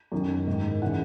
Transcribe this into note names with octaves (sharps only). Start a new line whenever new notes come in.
F#2 D#3
G#2 D#3
C#3 E3 F#5